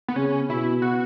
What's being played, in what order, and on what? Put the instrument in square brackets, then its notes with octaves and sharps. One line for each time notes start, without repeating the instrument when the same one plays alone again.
[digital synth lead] B3
[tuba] C#3 [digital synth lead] C#4
[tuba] B2 [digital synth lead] E4
[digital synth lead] F#4